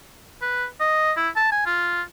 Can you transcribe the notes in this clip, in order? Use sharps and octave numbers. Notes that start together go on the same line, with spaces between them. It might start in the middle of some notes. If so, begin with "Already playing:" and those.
B4
D#5
E4
A5
G#5
F4